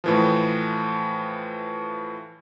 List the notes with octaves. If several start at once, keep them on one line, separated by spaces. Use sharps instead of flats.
A2 E3 F3